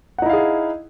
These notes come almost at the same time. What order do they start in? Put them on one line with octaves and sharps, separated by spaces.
F#5 D#4 E4 F5 G#4